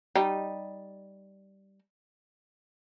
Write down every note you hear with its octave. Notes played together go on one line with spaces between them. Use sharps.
G3 D#4